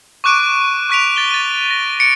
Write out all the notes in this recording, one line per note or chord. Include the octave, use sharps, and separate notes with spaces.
C#6 D6 F#6 D7 D#7
C#6 F#6 B6 D7 F7
A6 G7
A6 D#7
A#6
C#7 D7